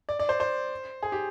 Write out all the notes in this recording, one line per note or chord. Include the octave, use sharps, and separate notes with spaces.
D5
D5
C5
C5
G#4
G4